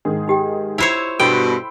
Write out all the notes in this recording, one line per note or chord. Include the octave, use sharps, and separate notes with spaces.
G#2 D#3 G#4
D#4 G4 G5
E4 F4 C5 C#5 E5 E6 F7
G2 B2 A4 G5 B5 C6 E6